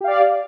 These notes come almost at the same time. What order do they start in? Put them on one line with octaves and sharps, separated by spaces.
G4 F5 D5